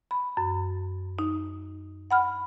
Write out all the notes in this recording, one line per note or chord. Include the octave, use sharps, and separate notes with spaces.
B5
F#2
D#4
F#5 B5 F6